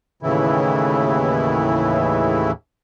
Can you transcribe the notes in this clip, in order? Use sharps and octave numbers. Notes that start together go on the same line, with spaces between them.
D#2 A2 C#3 E3 E4